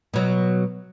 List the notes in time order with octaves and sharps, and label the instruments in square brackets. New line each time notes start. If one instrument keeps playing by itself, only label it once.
[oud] B2 F#3